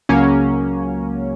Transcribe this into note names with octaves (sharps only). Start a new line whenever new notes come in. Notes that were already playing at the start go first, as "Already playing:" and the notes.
C#2 C#3 F#3 A#3 C#4